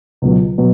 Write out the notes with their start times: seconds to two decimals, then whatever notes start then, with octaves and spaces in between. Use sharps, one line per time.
0.22 C#2 B2 F#3
0.58 B2 F#3